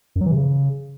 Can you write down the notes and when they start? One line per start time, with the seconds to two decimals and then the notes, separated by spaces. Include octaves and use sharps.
0.16 F#2
0.21 F#3
0.26 E3
0.31 C3
0.37 C#3